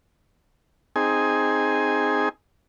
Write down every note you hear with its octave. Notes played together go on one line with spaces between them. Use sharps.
C4 D#4 G#4 G#5